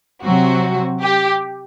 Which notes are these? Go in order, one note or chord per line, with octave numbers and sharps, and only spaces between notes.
C3 F#3 C4 F#4
G4